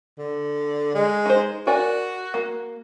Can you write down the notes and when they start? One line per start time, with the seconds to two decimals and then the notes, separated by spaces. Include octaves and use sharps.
0.18 D3
0.94 G#3
1.26 D#4 C5
1.67 F#4 A#4 D5 G#5
2.34 A#3